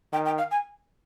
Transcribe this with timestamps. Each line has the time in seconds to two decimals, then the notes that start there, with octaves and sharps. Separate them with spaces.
0.13 D#3 G5
0.25 G5
0.38 F5
0.51 G#5